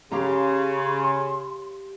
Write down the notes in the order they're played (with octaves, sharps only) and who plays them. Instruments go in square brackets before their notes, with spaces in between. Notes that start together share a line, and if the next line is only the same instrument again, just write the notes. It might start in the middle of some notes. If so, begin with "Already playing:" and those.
[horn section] C#3 [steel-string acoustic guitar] G4 F5 A#5 [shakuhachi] C6